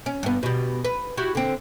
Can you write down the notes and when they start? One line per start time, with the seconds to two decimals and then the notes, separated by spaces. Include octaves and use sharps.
0.06 C#4
0.23 G2 B3
0.43 B2 G3
0.85 B4
1.17 E4 F#4 G4
1.35 D3 C4